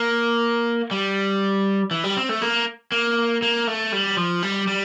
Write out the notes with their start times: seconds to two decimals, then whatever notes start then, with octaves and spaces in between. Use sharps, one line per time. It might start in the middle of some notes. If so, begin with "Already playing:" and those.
Already playing: A#3
0.91 G3
1.91 E3
2.04 G3
2.17 C4
2.29 A3
2.42 A#3
2.92 A#3
3.42 A#3
3.67 A3
3.92 G3
4.17 F3
4.42 G3
4.67 G3